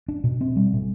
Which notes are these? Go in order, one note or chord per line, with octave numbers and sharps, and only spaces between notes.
D4
B2
C4
G3
B2